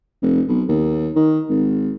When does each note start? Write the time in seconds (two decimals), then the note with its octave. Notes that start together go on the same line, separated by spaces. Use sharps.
0.22 F1
0.48 B1
0.69 D#2
1.16 D#3
1.49 G#1